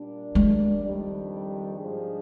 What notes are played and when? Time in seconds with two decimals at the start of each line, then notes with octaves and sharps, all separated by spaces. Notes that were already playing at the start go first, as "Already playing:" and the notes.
Already playing: A#2 G3 D4
0.35 G#3
0.83 F2 D#3 G3 D4
1.77 G#2 F3 G#3 D4 G#4